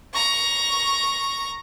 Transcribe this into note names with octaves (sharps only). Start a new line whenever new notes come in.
A#5 C#6